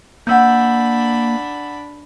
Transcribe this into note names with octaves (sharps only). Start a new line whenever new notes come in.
A#3 D4 F#5 B5 E6 G6